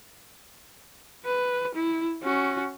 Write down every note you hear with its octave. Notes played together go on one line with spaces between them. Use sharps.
B4
E4
C#4 F#4